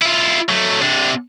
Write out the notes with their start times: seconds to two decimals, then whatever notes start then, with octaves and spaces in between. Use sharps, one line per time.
0.02 E4 F4
0.49 F#3 A3
0.82 C3 D4